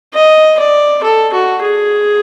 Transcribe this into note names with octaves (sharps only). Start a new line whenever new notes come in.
D#5
D5
A4
F#4
G#4